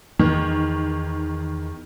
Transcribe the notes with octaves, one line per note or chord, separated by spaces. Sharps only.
E2 D#3